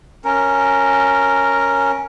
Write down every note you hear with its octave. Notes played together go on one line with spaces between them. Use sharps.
C#4 A#4